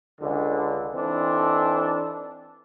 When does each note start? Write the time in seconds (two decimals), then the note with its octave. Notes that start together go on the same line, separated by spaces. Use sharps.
0.21 C#2 D3
0.94 E3 C4 D4 D#4 A4